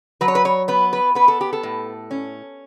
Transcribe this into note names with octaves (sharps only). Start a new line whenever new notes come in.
F#3 B4
C#5
B4
C#5
B3 B4
B4
B3 B4
A4
G4
A4
A2
C#4